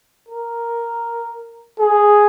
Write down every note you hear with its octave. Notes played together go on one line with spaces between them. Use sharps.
A#4
G#4